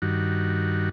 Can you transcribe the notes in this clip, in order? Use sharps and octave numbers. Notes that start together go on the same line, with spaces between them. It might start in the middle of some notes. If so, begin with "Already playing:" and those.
G2 D#3 F#4